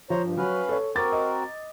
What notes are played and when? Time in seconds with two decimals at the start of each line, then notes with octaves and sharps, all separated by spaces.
0.10 F3 C5 C#5 A#5
0.23 G2
0.37 F#3 C#4 B4 F5
0.69 A4 C#5
0.95 C4 F#4 A#4 D6 A6
1.12 D#5